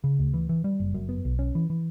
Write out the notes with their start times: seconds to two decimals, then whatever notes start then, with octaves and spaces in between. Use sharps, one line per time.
0.04 C#3
0.19 D2
0.34 E3
0.49 E3
0.64 G3
0.80 F#1
0.94 F#2
1.09 B3
1.25 B1
1.39 C#4
1.55 E3
1.70 E3